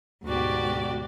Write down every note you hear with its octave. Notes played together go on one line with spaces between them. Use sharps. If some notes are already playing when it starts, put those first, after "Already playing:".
D2 G#2 B2 F#4 G4 D5